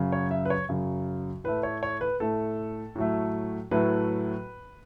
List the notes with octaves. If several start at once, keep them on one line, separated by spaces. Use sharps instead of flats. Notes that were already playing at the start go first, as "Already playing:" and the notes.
Already playing: F#2 C#3 F#3
C#5
E5
B4
C#5
F#2 C#3 F#3
A2 A3 B4
C#5
C#5
B4
A2 A3 A4
A2 F#3 A3
A2 F#3 A3 B4